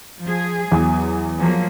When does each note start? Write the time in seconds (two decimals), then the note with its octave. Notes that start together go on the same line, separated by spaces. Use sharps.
0.22 F3 G#4
0.72 E2 F#3 G#5 D#6
1.38 F3 F#3 A#3